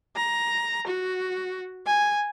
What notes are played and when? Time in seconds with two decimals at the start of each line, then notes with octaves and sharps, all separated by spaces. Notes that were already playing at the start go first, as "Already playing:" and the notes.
0.16 A#5
0.87 F#4
1.86 G#5